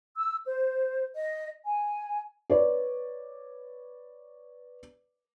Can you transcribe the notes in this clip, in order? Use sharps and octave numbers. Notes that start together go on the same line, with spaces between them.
E6
C5
D#5
G#5
B4 C#5 D5